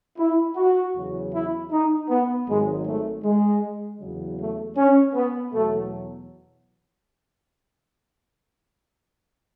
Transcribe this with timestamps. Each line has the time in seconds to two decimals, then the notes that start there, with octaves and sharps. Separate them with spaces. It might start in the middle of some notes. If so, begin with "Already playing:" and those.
0.18 E4
0.56 F#4
0.95 E2 C#3 F#3
1.33 E4
1.72 D#4
2.09 B3
2.47 G#1 G#2 D#3 F#3 G#3
2.85 A3
3.23 G#3
4.01 E2 C#3 F#3
4.39 A3
4.77 C#4
5.15 B3
5.53 E2 B2 F#3 A3